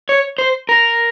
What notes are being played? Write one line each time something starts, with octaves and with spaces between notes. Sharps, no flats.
C#5
C5
A#4